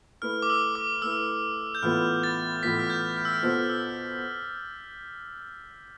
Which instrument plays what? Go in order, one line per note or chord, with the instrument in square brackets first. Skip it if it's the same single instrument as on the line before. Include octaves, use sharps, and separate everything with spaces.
[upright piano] A3 E4 B4 [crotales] F6
[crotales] D6
E6
D6
[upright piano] A3 E4 B4 [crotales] E6
[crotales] G6
[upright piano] A2 E3 B3 F4 B4 [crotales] F6
[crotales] A6
[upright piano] A2 E3 B3 F4 B4 [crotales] B6
[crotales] F6
G6
F6
E6
F6
[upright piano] B2 B3 F4 A4 C5 [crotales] F6
[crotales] E6